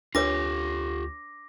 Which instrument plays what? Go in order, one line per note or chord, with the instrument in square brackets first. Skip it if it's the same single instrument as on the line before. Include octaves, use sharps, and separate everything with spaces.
[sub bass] D2 [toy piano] D4 B4 C#5 [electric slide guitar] F4 G4 [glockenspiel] D6 A#6